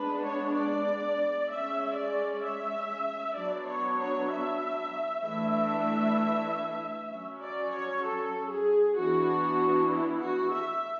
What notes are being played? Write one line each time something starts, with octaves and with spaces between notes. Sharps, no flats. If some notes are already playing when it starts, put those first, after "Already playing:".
Already playing: G#3 B3 D4 B4
C#5
D5
G#3 C#4 E5
D5
E5
F#3 B3 D4 D5
C#5
C#5
E5
E3 A3 D4 E5
F#3 C#4
D5
C#5
A4
G#4
E3 B3 D4 F#4
E4
F#4
E5